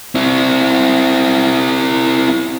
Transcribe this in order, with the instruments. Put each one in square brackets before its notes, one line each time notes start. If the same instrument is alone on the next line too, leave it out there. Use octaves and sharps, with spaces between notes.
[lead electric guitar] C4 E4